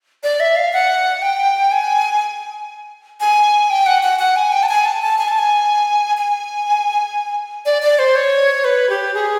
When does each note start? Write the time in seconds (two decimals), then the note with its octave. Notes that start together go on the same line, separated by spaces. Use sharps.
0.23 D5
0.40 E5
0.56 F5
0.73 F#5
1.22 G5
1.72 G#5
3.20 G#5
3.70 G5
3.86 F#5
4.03 F#5
4.19 F#5
4.36 G#5
4.52 G5
4.63 A5
4.69 G#5
4.85 A5
5.02 A5
5.19 G#5
5.28 A5
5.39 G#5
6.17 G#5
7.66 D5
7.82 D5
7.99 C5
8.16 C#5
8.64 B4
8.89 G4
9.14 G#4